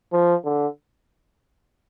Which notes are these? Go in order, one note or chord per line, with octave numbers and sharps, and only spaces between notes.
F3
D3